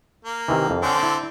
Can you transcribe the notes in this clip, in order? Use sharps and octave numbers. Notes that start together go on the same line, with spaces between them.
A#3
C3 D#3 E3
F2
D3 C4 C#4 F#5 A5
E4